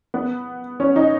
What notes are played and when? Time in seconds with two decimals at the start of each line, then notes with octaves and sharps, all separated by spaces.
0.14 B3
0.80 C#4
0.96 D#4